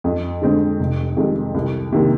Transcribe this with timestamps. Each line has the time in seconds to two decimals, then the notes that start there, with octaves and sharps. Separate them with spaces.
0.04 F2
0.42 D3 G#3 C4
0.80 F1
1.17 F2 C3 D#3 G#3
1.54 C2
1.92 C3 D#3 A#3